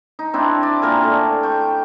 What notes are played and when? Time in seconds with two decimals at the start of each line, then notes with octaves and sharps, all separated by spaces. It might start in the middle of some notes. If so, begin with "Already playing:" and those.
0.19 D#4
0.34 C4 D4 E4
0.63 D5
0.82 A#2 A#4 G#5
1.04 A3
1.43 G5 C#6